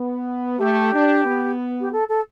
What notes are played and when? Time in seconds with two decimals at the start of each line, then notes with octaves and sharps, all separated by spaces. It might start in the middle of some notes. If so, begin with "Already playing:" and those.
Already playing: B3
0.58 A3 G4
0.93 D4
1.25 B3
1.80 G4
1.92 A4
2.09 A4